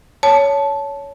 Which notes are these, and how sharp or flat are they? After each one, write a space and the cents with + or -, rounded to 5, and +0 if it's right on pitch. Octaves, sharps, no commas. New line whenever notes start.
C#5 +20 A5 -10